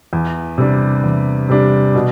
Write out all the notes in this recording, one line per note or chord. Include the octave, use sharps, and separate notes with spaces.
E2
C3 G3 D4
E2
C3 G3 D4
B2